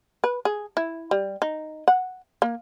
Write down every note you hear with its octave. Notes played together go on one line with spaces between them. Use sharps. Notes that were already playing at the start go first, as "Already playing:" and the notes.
B4
G#4
E4
G3
D#4
F#5
A#3